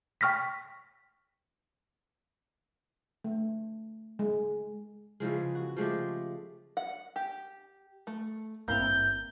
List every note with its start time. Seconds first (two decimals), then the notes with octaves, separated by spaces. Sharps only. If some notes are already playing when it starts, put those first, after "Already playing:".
0.21 G5 C#6 F6 A#6 B6
3.24 A3
4.19 G#3
5.20 C#3 E3 F3 G#3
5.55 F#4
5.77 F3 G#3 A3 G4
6.77 F#5
7.16 G4
8.07 A3
8.68 G#1 G2 A#3 C4 E4 A#5 G6